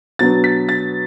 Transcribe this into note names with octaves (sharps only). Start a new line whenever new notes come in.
B2 F#3 B3 D4 A6
B6
A6